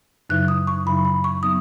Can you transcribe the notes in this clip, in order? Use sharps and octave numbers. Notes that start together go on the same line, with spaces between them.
F#2 C#3 F#3 D#4 F#6
D#6
C#6
F#2 C#3 F#3 D#4 B5
B5
C#6
F#3 B3 D#4 D#6